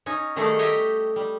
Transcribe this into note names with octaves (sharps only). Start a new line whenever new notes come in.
C#4 D#4 G#5
D#3 G3 A3 D#4 G#4 A4
G4 C#5 D#5 E5 G5
G3